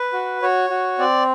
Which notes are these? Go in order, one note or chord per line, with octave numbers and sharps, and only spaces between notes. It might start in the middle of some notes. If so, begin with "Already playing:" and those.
Already playing: B4
F#4
F#4 C#5
F#4
C4 D5